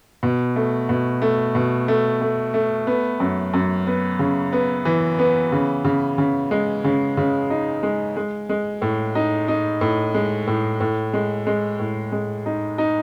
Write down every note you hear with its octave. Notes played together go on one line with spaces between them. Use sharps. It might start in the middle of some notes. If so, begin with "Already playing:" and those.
B2
A3
B2
A3
B2
A3
A3
A3
B3
F#2
F#2
B3
C#3
B3
E3
B3
C#3
C#3
C#3
G#3
C#3
C#3
D#4
G#3
G#3
G#3
A2
D#4
D#4
A2
G#3
A2
A2
G#3
G#3
A2
G#3
D#4
D#4